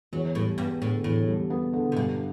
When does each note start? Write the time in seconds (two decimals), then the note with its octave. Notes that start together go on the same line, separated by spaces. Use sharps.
0.13 E2 F#3
0.35 A2 G3
0.58 G2 B3
0.81 A2 D3
1.04 E2 A2
1.27 G3
1.50 B3
1.73 D3
1.92 C3
1.96 G2 B2